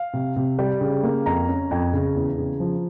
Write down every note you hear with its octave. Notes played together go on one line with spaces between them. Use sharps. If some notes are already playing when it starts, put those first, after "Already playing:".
Already playing: F5
C3
C3
G3 G5
C#3
A#3
F2 A#5
C#4
F2
C#3
E2
C#3
F3